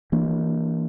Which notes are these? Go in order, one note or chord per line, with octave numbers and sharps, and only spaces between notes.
E3 A#3 D4